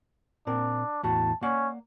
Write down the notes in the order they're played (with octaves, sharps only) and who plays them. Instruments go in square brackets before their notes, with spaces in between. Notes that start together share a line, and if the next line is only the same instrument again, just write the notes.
[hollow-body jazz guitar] A#2 C4 A#4 [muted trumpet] D4
[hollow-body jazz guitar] E2 A2 F#4 [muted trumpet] A5
[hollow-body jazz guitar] A#3 D5 F#5 [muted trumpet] C#4